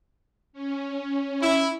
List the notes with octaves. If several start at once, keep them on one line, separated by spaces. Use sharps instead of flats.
C#4
E4